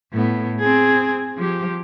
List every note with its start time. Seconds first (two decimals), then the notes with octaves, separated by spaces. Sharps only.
0.13 A2 B3
0.59 C4 G#4
1.37 F3 G4